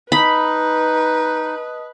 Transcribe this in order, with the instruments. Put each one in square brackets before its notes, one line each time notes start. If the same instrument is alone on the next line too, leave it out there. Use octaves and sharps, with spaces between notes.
[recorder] D#4 [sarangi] B4 [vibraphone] D#5 A5 D#6 [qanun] B5